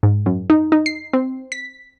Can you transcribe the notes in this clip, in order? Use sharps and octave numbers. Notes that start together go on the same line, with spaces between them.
G#2
F#2
D#4
D#4
C7
C4
B6